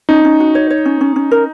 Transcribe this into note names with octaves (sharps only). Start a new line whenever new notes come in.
C#4 D#4
C#4
F#4
C#5
C#5
C#4
C#4
C#4
A#4